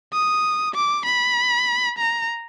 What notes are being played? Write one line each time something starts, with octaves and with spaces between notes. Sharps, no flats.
D#6
D6
B5
A#5